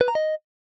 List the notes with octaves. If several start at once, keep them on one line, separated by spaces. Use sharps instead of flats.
B4
A#5
D#5